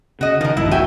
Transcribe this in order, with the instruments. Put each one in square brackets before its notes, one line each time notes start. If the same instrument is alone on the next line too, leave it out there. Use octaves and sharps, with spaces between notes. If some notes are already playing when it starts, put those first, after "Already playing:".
[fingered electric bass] C#3 [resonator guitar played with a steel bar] F#4 D#5
[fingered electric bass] D#3 [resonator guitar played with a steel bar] F3 A#4
[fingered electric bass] D1 A#1 G2 [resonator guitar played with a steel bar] E4
[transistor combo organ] F#4 E5 G5 [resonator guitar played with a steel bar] G#5